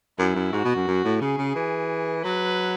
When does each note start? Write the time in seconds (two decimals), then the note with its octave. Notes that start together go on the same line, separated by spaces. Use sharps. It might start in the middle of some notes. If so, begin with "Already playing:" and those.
0.19 F#2 E4
0.35 F#2
0.52 G#2 F#4
0.65 B2
0.76 F#2
0.88 F#2
1.05 A2
1.21 C#3 G#4
1.38 C#3
1.56 E3
2.24 F#3 B4